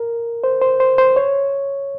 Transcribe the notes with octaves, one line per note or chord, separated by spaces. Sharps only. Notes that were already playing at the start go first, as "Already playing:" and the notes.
Already playing: A#4
C5
C5
C5
C5
C#5